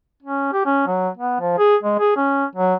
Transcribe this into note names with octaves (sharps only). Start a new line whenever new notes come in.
C#4
G4
C#4
F#3
B3
F3
G#4
G#3
G#4
C#4
F#3